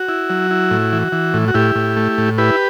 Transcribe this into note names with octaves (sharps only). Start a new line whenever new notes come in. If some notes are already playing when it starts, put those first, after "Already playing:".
Already playing: F#4
E4
F#3
E4
A2
E3
E3
A2
F#4
A2 E4 G4
A2
A3
A2
E4 G4 B4